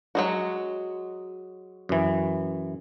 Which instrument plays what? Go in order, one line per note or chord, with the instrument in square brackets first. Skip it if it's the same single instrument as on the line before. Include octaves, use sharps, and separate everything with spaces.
[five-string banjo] F#3 G#3 F#4
[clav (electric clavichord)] F#2 E3